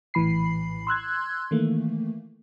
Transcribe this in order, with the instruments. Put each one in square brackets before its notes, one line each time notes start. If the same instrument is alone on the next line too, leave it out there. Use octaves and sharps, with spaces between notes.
[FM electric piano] A#1 A2 E3 B5 C7
C6 E6 F#6 G#6
D#3 E3 A3 A#3